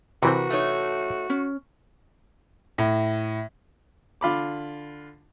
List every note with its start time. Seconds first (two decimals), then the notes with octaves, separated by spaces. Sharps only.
0.23 C3 E3 C4 F#4 A#4 B4
0.50 A3 D#4 C#5
1.30 C#4
2.78 A2
4.21 D3 F4 B5 D6